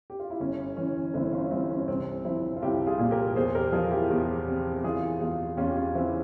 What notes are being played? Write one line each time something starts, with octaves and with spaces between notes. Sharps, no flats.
G4
F4
E4
G1 C#4
E3 C#4
G1 C4 E4
C#4 F4
G2 C4 E4
C#4
C2 C4
F3 C4 E4
F4
C2 E4 G4
F4 G#4
A#2
G4 A#4
E2 G#4 C5
G4 A#4
F3 F4 G#4
E4 G4
E2
C3
E3 F4 G#4
E2 F4 G#4
E2 C#4 F4
G4
C#4 F4
E3 C4 E4